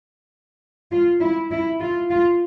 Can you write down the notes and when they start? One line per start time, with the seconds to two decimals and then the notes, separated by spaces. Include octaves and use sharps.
0.92 F4
1.21 E4
1.51 E4
1.81 F4
2.10 F4